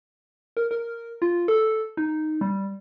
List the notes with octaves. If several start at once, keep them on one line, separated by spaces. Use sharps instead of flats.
A#4
A#4
F4
A4
D#4
G3